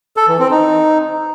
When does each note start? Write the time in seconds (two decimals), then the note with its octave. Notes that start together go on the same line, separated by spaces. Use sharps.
0.17 A4
0.28 E3
0.39 C4
0.51 D#4